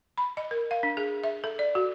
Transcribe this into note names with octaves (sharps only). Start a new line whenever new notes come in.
B5
D#5
A#4
F5
D4
G#4
E5
A4
D5
F#4